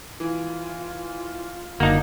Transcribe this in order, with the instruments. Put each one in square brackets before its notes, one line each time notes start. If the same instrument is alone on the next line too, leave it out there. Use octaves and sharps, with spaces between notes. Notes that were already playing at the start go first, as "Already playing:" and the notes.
[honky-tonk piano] E3 [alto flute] F4
[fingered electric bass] F#1 D3 [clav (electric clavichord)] A#3 D#4 [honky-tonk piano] D4 F#4